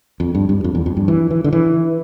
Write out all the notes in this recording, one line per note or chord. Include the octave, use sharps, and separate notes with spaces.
F2
G2
G2
F2
E2
F2
G2
E3
E3
D3
E3